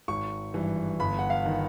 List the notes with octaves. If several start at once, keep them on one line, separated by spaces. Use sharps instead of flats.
G#1 C#6
G2 E3
G1 B5
F#5
F5
D#3